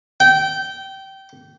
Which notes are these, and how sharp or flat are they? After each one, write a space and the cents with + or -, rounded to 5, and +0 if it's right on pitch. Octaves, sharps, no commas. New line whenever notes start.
G5 -20